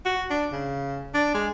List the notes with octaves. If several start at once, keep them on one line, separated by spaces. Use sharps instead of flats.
F#4
D4
C#3
D4
G#3